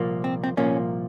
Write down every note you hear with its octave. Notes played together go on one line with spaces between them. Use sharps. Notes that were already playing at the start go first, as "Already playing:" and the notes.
Already playing: C2 A#2 F3 A#3
C4
C4
C2 A#2 F3 A#3 C#4